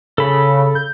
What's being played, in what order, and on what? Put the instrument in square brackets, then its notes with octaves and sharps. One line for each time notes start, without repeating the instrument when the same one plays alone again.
[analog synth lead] C#3 [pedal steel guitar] A4 B5
[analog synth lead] C#3
G6